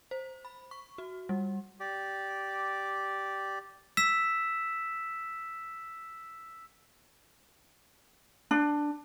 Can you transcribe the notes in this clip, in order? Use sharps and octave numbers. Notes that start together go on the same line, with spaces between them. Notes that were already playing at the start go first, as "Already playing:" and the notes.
C5
B5
C#6
F#4
G3
G4 D5
E6 B6 E7
D4